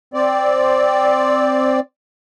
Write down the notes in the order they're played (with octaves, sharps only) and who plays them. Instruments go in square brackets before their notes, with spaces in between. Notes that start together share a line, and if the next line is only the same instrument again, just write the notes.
[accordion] C4 D5